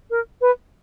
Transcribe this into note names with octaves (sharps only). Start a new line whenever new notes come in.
A#4
B4